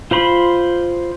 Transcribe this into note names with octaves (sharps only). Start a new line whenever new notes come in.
F4 C5 B5 C6